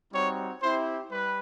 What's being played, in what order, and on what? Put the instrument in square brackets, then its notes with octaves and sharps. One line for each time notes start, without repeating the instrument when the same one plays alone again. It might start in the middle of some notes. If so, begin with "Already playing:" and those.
[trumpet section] G3 C4 D#4 F#4 C#5
C4 E4 G4 C5
G3 B4